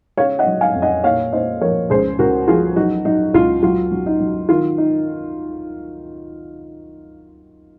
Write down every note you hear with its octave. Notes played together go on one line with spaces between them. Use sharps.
C#3 C#5 F5
D#5 F#5
F#3
F5 G#5
F2
D#5 F#5
A#2 C#5 F5
A#2 C5 D#5
F3 A#4 C#5
C#2 G#4 C5
C#2 F#4 A#4
F3 F4 G#4
F#3 D#4 F#4
F#3 D#4
C#2 F4
F#3 F4
F#3
D#4
F#3
D#3 F4
D#4